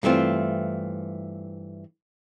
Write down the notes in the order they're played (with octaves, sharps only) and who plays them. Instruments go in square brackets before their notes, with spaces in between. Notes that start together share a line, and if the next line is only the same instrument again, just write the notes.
[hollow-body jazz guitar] G2 E3 A3 C4 F4